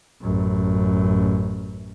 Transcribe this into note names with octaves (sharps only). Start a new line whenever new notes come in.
A1 F#2